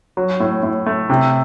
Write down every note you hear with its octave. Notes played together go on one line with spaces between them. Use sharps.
F#3
A2
A2
A3
C3